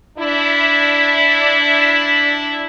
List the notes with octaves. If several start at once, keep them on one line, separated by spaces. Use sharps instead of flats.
D4 E4